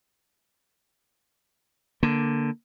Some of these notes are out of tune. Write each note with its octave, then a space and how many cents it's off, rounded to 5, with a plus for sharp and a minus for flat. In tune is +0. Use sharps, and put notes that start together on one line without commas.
D3 +0 A#3 +10